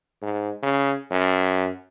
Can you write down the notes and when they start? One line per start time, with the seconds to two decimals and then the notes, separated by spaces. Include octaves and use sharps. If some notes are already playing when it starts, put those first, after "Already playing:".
0.22 G#2
0.63 C#3
1.11 F#2